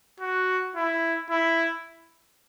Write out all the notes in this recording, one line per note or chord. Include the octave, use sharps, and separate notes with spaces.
F#4
E4
E4